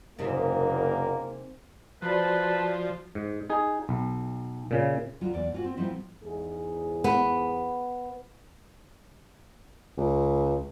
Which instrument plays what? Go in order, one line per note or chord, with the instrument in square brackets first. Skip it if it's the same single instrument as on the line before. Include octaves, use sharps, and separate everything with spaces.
[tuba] F#1 [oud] G#2 C3 [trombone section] A#3
[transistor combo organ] F3 [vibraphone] F#4 C5 D5 [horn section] B4 A5
[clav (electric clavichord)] G#2
D#4 G#4
B1
A#2 C#3
[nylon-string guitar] D2 F#3 G3 F4
E2 B3 D5
G#2 F4 F#4
C4
G#2 F3 G3 B3 C4 E4
[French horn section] E2 G#2 G#4
[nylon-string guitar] B3
[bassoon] C#2